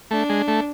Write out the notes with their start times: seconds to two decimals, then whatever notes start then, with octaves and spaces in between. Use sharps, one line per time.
0.11 A3 D4
0.29 G#3
0.48 A3